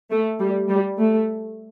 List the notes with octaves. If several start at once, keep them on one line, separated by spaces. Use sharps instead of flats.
A3
G3
G3
A3